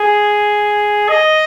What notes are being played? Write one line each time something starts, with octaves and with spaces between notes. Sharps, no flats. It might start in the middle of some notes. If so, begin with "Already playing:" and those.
Already playing: G#4
D#5